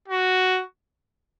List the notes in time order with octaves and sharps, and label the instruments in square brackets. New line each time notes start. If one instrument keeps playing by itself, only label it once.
[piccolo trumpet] F#4